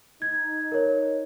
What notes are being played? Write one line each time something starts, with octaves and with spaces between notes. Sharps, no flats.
D#4 G#6
A#4 C#5